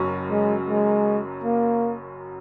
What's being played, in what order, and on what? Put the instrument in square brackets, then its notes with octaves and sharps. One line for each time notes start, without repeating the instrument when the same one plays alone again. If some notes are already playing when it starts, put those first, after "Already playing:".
Already playing: [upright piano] F#1 F#2 F#3 C#4
[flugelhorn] G#3
G#3
A#3